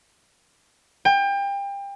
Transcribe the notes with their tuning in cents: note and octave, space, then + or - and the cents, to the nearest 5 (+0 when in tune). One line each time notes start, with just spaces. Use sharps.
G5 +30